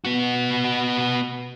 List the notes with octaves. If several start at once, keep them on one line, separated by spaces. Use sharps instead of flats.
B3 F#4